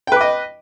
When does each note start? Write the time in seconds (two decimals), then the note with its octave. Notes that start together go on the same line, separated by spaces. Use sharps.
0.07 G5
0.12 B4
0.16 D6
0.21 D#5